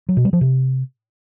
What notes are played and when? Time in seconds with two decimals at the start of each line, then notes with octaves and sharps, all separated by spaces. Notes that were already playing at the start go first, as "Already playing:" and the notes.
0.09 F#3
0.17 B2
0.25 G3
0.33 F3
0.41 C3